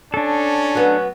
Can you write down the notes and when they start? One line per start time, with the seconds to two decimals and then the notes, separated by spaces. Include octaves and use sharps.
0.14 C#4 D4 A4
0.75 F#3 B3